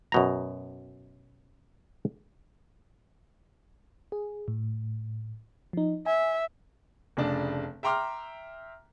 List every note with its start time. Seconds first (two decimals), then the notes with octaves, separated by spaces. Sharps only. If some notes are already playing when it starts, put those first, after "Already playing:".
0.12 F#2 B2 A#5
4.12 G#4
4.48 A2
5.73 F3 D#4
6.06 E5 G#5
7.17 F1 C#3 D4 A5
7.83 E5 G5 A#5 C6 D6 F6